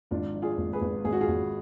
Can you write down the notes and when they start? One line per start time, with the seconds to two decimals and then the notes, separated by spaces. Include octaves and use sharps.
0.11 G#1 D4 F4
0.34 F3
0.42 F4 G#4
0.58 G#1
0.73 G#4 B4
0.82 G#1
1.05 G#1 G#4
1.12 F#4
1.21 F4 G#4
1.28 G#1